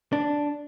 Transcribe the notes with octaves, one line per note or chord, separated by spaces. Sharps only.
D4